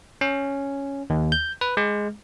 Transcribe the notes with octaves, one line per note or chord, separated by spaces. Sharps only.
C#4
D#2
G6
B4
G#3